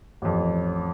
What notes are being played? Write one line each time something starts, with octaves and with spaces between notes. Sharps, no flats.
A1 F2